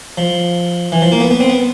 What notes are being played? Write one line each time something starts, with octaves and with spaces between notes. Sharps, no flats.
F3
E3
F3
A#3
B3
B3
C4
B3